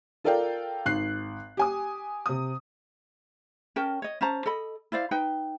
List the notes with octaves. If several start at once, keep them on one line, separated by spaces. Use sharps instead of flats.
F4 A4 A#4 D5 F5 G5
G#1 F#6 C7
G4 G#5 D#6
C3 D#6
C#4 A#4 G5 A5
C#5 D#5
C#4 C5 A5 A#5
A4 D#5 B5
E4 C5 D5 F5
D#4 B4 G5